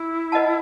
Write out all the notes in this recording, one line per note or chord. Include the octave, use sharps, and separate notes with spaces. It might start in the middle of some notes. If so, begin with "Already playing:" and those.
Already playing: E4
B4 D#5 F#5 A5